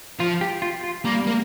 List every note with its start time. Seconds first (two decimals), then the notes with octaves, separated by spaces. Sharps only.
0.20 F3 F4
0.41 G4
0.62 F4
0.84 F4
1.05 G3 A#3
1.27 A#3